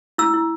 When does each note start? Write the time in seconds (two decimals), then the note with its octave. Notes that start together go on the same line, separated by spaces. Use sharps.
0.18 E4 E6
0.33 E4